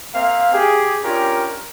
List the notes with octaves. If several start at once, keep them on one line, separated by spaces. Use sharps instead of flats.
A#3 C4 E5 F5
G4 G#4
C#4 D4 F4 G4 A#4